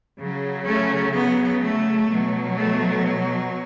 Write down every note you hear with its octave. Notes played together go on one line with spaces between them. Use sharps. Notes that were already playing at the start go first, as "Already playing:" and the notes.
C#3 F#3
A3 C#4
B3
A3
B2 F#3
A3